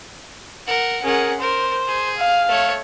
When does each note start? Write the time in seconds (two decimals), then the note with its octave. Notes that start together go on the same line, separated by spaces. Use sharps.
0.67 A#4 F#5
1.04 C#4 G#4 A#4 F#5
1.40 A#4 C5
1.88 G#4
2.17 F5
2.48 A3 C#5